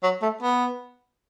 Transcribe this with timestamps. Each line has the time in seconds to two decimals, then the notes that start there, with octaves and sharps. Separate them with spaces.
0.03 F#3
0.22 A3
0.42 B3